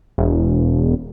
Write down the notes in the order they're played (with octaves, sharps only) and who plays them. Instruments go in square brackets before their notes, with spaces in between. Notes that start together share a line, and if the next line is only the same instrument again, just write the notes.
[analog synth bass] E1